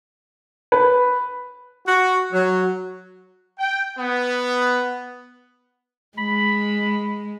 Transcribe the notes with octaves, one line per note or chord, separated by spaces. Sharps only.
B4
F#4
F#3
G5
B3
G#3 B5